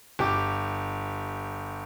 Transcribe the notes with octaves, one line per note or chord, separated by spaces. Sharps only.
G1 G4 D6